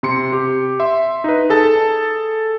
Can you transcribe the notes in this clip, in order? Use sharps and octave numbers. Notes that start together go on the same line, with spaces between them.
C3 C6 C#7
G4
E5 C6
D#4 B4
G#4 A4 A5